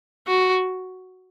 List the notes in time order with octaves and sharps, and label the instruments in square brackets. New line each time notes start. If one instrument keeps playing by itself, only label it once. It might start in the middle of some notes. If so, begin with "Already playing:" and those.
[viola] F#4